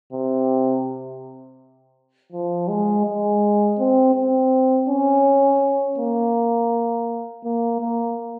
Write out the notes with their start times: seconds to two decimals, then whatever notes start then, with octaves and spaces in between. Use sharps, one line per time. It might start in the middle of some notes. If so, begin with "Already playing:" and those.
0.12 C3
2.32 F3
2.69 G#3
3.06 G#3
3.79 C4
4.15 C4
4.89 C#4
5.98 A#3
7.44 A#3
7.81 A#3